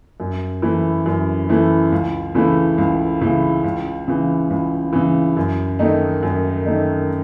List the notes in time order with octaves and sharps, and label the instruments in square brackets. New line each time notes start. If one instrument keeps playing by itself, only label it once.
[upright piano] F#2
E3 A3 E4
F#2
E3 A3 E4
C#2
C#3 E3 A3 E4
C#2
C#3 E3 A3 E4
C#2
C#3 E3
C#2
C#3 E3
F#2
D#3 A3 D#4
F#2
D#3 A3 D#4